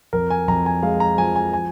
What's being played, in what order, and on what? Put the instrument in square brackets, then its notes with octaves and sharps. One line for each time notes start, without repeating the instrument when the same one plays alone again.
[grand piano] F2 A#4
G#5
F2 A#5
G#5
G#3 F5
A#5
F3 G#5
G#5
G#5